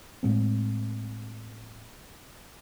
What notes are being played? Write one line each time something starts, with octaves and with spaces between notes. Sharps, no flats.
A2 G#3 C4